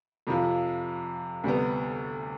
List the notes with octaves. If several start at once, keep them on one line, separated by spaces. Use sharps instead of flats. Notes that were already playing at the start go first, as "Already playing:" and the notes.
F2 C3 F3
D2 C3 G3 B3